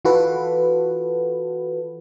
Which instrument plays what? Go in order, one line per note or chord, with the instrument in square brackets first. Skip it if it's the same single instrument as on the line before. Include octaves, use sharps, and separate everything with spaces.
[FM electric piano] E3 F4 F#4 A4 B4